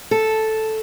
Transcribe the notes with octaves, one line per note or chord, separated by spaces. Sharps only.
A4